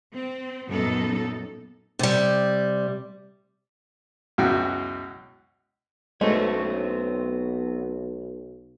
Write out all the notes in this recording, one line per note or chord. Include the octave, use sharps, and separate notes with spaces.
C4
F#2 A#2 B3 D#4 A4
C3 G3
C#2 F#2 B2 E4 F#4 G5
B1 G#3 A3 B3 C4 C#5